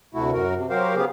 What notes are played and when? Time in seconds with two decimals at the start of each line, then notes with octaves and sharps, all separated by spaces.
0.14 D2 C3 A3 E4 F#4
0.33 F#2 F#4 A#4
0.55 C3
0.70 F#3 F#4 G4 A#4 C5 F5
0.96 C#3 B3 G4 G#4 F5